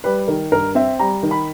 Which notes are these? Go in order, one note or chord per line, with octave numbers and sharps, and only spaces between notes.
G3 B4
D#3 A#4
G2 A#4
C4 E5
G3 A#5
D#3
B5